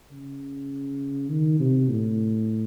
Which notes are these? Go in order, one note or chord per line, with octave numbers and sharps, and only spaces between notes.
C#3
D#3
C3
A2